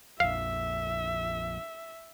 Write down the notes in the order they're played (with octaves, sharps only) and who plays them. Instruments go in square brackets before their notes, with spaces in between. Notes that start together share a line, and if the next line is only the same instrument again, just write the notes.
[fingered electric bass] A#1 F2 [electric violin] E5 [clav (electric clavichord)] F5